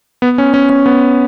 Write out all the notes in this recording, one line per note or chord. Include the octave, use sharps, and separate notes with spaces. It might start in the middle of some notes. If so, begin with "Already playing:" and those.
B3
C#4
C#4
C#4
B3